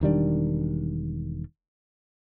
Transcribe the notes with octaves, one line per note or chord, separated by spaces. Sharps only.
E1 D#3 G3 D4